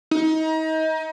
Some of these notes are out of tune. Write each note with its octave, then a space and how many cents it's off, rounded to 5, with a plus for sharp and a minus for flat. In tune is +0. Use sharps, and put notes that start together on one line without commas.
D#4 +30